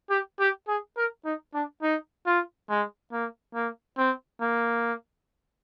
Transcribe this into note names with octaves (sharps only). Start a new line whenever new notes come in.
G4
G4
G#4
A#4
D#4
D4
D#4
F4
G#3
A#3
A#3
C4
A#3